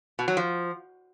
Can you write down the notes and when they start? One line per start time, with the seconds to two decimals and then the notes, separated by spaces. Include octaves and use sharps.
0.19 B2
0.28 F#3
0.37 F3